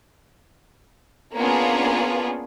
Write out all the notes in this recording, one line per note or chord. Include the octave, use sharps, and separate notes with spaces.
A#3 B3 C#4 D4 F4 G#4